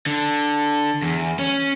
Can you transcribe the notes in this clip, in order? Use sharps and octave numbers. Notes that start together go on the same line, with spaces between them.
D3
E2
C#4